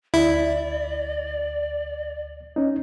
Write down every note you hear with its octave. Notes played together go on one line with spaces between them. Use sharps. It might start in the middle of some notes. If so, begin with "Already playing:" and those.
D2 E4 D5
C#4 D#4